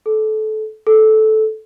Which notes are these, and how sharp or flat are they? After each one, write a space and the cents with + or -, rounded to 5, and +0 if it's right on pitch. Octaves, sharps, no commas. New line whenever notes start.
A4 -25
A4 -15